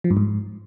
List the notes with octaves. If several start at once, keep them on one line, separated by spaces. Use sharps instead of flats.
F3
G2
G#2